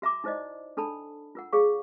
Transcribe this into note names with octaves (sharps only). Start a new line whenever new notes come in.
F#4 E5 A#5 D6
D#4 E4 C5 D5 D#5
D4 A4 A5 B5
F4 A#4 F#5
G#4 C#5 F5 C#6